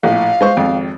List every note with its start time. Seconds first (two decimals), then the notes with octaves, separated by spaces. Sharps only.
0.03 A#1 A2 F5
0.41 G#3 C5 C#6
0.57 G#1 F2